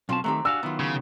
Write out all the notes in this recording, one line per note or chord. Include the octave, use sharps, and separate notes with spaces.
B1 C4 C#4 F4 A5
D#3 F#3 G#3 A3 C4 G4
D4 F#4 F5 G#5 E6
D#3 F#3 B3 E4 F4
C#3